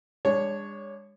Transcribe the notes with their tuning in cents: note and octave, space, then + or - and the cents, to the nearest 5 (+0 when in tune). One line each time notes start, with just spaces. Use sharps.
G#3 -35 D4 +0 C#5 +0